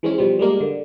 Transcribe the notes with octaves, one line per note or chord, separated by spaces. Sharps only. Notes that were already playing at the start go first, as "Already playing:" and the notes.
E3 G#3 C4 C#4
B2 F3 G3 C4
G3 G#3 A#3 D4
D3